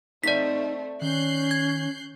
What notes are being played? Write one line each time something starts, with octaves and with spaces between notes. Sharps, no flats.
A3 C4 D#4 A4 D5 D#5 B6
D#3 C#4 F#6 G6 C7
G#6